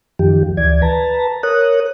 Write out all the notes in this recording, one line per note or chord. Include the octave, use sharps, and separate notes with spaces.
F#2 D#3 F3 G4
D2 E3 D5 G#6
B4 A5 A#5
A#4 C#5 D#6 F#6